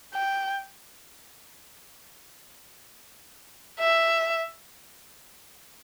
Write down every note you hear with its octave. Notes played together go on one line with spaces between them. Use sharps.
G5
E5